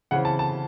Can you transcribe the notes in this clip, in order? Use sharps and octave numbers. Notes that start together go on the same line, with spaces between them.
C#3 E3 C4 F#5
A5
A5